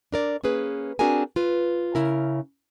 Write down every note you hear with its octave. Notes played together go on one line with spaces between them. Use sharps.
D4 A#4 D5
A#3 C#4 G#4 B4
C4 D4 F#4 G#4 A#4 G#5
F4 B4
C#3 E4 A#4